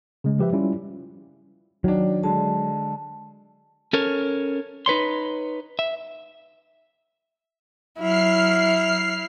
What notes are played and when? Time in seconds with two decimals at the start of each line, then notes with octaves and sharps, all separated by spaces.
0.24 C#3 G#3
0.39 F3 G4 B4 E5
0.53 G3 C#4 E4 F4
1.84 D#3 F#3 D4
2.23 D3 G#3 A5
3.93 C#4 A4 A#4 C#5
4.86 D#4 B4 C#5 C6
5.79 E5
7.99 F#3 E4 F6 C7